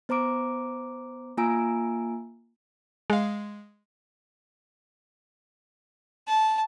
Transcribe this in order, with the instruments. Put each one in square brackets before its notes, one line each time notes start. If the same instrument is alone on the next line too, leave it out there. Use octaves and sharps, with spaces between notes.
[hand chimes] B3 C5 A#5 D6 D7
A#3 F4 G#5 A#5 E6 D7
[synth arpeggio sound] G#3 F5
[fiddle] A5